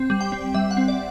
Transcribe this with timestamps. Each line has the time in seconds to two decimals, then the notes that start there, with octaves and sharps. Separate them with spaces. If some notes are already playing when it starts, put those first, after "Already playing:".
Already playing: C4
0.10 G3
0.21 G5
0.32 C4
0.54 G3 E5
0.71 F#5
0.77 C4
0.88 D5